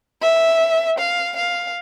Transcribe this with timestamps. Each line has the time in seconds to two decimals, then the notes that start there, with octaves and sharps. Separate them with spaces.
0.21 E5
0.98 F5
1.36 F5